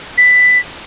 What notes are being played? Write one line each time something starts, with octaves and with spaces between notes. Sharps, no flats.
B6